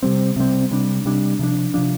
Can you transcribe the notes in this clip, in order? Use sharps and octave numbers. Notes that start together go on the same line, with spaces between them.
C3 G3 C4
C3 G3 C4
C3 G3 D4
C3 G3 D4
C3 F3 D4
C3 F3 D4